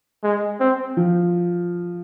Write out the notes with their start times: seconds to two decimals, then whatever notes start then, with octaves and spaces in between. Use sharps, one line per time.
0.23 G#3
0.60 C4
0.97 F3